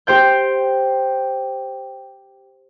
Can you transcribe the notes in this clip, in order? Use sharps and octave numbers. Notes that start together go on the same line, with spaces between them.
G4 C5 G5 G6